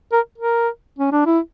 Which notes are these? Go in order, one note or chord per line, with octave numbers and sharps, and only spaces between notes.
A#4
A#4
C#4
D4
E4